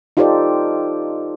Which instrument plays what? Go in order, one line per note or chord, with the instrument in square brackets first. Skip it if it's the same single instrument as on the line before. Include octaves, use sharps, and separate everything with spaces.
[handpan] D#4 F4 G4 A4 C5 D5